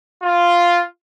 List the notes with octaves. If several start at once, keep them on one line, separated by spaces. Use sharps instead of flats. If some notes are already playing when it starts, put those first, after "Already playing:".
F4